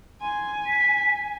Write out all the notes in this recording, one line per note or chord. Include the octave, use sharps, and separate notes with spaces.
G#5 C6
B6